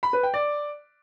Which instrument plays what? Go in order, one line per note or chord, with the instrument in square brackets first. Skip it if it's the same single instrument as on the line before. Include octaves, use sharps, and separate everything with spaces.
[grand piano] B5
B4
G5
D5